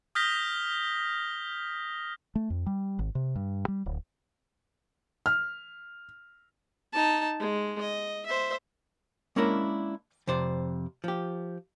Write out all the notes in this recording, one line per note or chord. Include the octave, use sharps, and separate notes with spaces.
D#6 F6 G6 A#6 B6 G7
A3
F2
G3
G#1
C3
G2
G3
D1
F6
D#4 A5
G#3
D#5
C5 E5
G#3 A#3 C#4 D4 E4 A#4
F2 C3 C5 D5
F3 G4